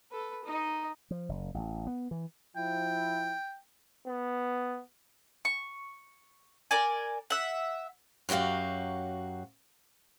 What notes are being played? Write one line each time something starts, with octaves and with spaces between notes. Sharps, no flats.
A4 B4
D#4 D#5
F3
F#1
A1
B3
E3
F3 E4 G5
B3
C#6
A#4 D5 G#5
E5 F#5
F#2 F#3 F#4 G4 F5